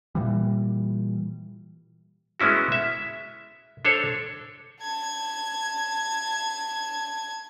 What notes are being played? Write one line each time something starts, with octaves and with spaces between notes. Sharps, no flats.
A#2 E3 G3
G#3 B3 C#4 E4 F#4
E5
D4 A4 C5 C#5
A5 G#6